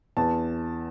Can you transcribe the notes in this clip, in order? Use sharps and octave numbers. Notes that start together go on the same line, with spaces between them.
E2 A5